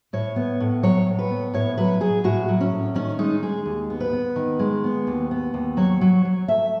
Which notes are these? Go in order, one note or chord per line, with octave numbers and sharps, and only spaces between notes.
A2 C#5
B3
A2
F#3 C#5
A2
B4
B3
A2 C#5
F#3 B4
F#3 G#4
A2 F#4
F#3
C#4
A2
D#3 C#4
G#3 D#4
G#3 G#4
D#2
B3
B4
B3
D#3
G#3
B3
D#2
B3
D#2
F#3 C#5
F#3
F#3
A3 E5